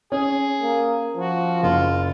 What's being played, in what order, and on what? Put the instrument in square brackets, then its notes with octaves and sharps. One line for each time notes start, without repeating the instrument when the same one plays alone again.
[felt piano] C#4 [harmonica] G#4
[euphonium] A#3
[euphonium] F3 [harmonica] F#4
[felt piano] F#1 [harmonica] F4